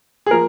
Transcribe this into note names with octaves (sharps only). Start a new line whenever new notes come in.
G#4
F3 A#3 A#4